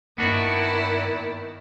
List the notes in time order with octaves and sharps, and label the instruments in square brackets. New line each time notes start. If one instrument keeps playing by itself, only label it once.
[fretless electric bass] G2 A#3 [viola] D#3 [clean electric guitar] B3 D4 F#4 [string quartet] E4 D5